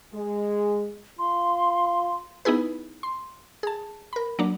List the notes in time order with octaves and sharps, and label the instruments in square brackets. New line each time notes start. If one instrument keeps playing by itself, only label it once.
[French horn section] G#3
[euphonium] F4 [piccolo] C6
[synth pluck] B3 D#4 E4 G#4 B4
C6
G#4 A5
A#4 B5
F#3 A#3 D4